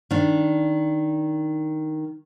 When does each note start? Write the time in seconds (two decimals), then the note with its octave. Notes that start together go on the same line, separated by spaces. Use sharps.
0.11 D#3 D4